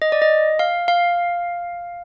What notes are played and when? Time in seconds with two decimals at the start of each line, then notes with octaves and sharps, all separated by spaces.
0.02 D#5
0.12 D5
0.22 D#5
0.59 F5
0.88 F5